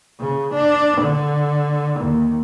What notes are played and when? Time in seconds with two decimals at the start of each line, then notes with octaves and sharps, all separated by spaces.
0.20 C#3
0.54 D4
1.02 D3
2.00 D#2